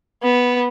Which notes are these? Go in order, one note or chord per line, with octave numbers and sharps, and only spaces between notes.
B3